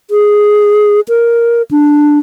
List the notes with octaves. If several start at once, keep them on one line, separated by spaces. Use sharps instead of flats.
G#4
A#4
D4